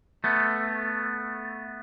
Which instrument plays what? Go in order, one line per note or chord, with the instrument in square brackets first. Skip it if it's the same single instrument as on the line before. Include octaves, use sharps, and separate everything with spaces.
[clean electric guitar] A3 B3